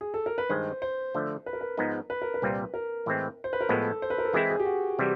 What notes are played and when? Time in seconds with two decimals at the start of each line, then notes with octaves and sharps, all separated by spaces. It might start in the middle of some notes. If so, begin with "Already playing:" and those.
0.01 G#4
0.14 A4
0.26 A#4
0.38 B4
0.49 G2 D#3 G#3 C5
0.82 C5
1.15 D3 F3 A3
1.46 B4
1.53 A#4
1.61 B4
1.78 G#2 F3 G#3 B3 D#4
2.10 B4
2.22 A#4
2.34 B4
2.42 C2 A#2 G3 C4 F4
2.74 A#4
3.06 A2 E3 G#3 C4
3.44 C5
3.53 B4
3.61 A#4
3.69 A2 F3 G#3 B3 A4
4.02 C5
4.10 B4
4.18 A#4
4.25 A4
4.33 E3 G#3 C4 E4 G#4
4.50 G#4
4.59 G4
4.65 F#4
4.99 C3 E3 G3